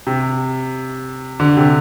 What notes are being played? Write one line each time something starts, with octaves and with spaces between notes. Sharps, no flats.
C3
D3
C3